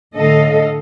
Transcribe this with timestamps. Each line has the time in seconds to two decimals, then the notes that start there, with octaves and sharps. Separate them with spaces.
0.15 A2 D3 A4 D#5 F5